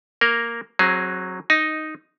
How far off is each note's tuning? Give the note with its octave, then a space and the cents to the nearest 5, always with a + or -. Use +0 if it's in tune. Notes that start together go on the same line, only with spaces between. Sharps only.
A#3 +0 A#4 +0
F#3 +0 C4 +35 G#4 +0
D#4 +0 D#5 +10